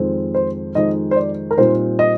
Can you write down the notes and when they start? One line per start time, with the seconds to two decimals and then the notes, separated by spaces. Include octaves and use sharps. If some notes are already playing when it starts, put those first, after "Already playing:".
Already playing: F2 D#3 G#3 C4
0.34 C5
0.75 F2 D#3 G#3 C4 D#5
1.11 C5
1.16 D5
1.51 A#4
1.58 A#2 G3 C4 D#4 C5
1.99 D#5